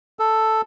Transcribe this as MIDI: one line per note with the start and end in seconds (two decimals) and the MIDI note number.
0.19 0.61 69